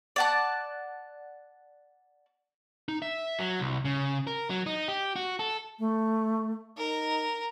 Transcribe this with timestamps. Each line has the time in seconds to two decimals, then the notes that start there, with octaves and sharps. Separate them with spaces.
0.16 D5 F#5 A5
2.89 D#4
3.02 E5
3.39 F#3
3.60 C2
3.85 C#3
4.27 A#4
4.50 F#3
4.66 D#4
4.88 G4
5.16 F#4
5.39 A4
5.79 A3
6.77 D#4 A#4